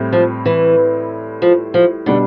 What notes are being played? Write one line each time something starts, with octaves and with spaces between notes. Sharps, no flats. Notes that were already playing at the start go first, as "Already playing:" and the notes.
Already playing: A2 G3 C4 E4
F3
E3
F3
F3
B2 D3 G3 D4